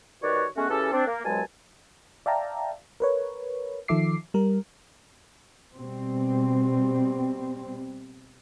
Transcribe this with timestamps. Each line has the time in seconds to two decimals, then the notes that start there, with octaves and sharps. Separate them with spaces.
0.23 D#3 G3 F#4 B4 C#5 D5
0.57 G#3 A3 B3 C#4 F#4
0.69 C#3 E3 C#4 G4 A4
0.92 C4 D4
1.07 A#3
1.25 C2 B2 F#3 G#3 G#5 A5
2.26 D5 E5 F5 G5 A5 A#5
3.00 A#4 B4 C#5
3.88 D#3 F3 A4 E5 D6 C7
4.34 G3 A#4
5.76 B2 G3 C4